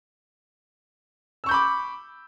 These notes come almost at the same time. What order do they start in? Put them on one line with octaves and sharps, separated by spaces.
E6 C#6 G6 B5 D6